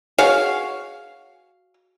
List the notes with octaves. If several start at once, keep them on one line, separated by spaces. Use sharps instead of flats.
F#4 G#4 C#5 F5